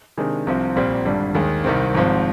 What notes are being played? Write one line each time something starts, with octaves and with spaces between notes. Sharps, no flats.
C3 D#3 G#3 D4
C2 C3 F3 C4
A#1 A#2 G3 C4
G#1 G2 D3 G3
D#2 D#3 G#3
C2 C3 D#3 G3 C4
G#1 G#2 F3 C4